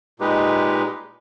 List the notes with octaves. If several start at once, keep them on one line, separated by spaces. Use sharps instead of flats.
A#2 G#3 D#4 G4 B4